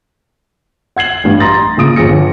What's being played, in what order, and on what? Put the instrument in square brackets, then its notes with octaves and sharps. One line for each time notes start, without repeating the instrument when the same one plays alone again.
[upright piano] F#5 G#6 C7 F#7
A1 G2
A#5 C6 D#6 A6 A#6
A#2 C#3 D#6 D7
G1 F3 G#4 A#6 C#7